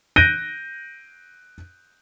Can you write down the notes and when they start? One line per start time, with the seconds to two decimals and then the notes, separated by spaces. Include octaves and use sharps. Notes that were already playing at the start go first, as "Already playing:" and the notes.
0.16 F#6 G6 A#6 D7 D#7 G7